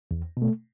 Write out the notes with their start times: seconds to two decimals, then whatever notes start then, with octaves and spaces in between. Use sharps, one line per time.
0.11 E2
0.37 B2 A3